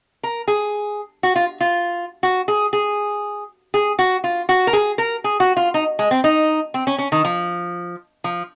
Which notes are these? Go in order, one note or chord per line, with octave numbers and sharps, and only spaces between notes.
A#4
G#4
F#4
F4
F4
F#4
G#4
G#4
G#4
F#4
F4
F#4
A#4
G#4
A#4
G#4
F#4
F4
D#4
G#3
C4
D#4
C4
C#4
C#4
D#3
F3
F3